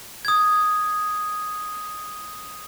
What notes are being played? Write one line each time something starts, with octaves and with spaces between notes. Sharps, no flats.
D#6 G#6